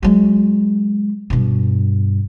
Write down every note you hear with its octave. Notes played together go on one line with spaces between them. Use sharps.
F#3 G#3
G2 B2